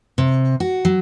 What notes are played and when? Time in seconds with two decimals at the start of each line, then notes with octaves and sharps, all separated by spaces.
0.18 C3
0.60 F#4
0.85 F#3